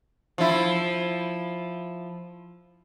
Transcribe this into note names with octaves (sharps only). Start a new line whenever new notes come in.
F3 E4